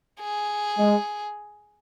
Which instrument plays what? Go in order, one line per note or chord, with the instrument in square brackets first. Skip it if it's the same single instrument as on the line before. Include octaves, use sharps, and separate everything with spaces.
[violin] G#4
[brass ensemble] G#3